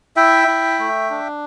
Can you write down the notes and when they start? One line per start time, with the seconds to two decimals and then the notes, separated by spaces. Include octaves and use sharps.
0.16 E4 E5 G5
0.48 E4
0.79 A3
1.10 D4